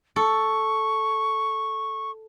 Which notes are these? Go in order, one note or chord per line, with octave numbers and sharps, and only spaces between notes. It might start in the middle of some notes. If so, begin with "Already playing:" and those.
A4 C#6